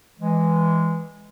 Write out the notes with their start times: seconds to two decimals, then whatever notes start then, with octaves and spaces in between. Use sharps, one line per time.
0.20 E3 G#3